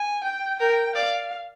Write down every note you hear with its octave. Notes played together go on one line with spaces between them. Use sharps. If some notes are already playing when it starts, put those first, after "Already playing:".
Already playing: G#5
G5
A#4 G5
D5 F5